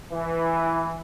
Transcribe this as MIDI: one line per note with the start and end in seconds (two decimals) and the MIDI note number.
0.12 1.01 52